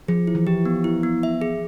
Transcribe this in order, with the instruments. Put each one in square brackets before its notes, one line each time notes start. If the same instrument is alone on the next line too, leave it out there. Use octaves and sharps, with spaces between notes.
[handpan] F3 [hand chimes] G#4
[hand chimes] E4
[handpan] E3
[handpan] F3 [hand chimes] G4
[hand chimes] B3
E4
B3
E5
G#4